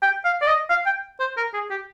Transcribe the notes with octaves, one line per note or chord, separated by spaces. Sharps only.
G5
F5
D5
D#5
F5
G5
C5
A#4
G#4
G4